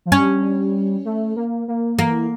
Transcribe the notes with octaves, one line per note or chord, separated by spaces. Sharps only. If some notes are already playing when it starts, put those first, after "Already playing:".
F3
G3 C#4
A3
A#3
A#3
E3 A#3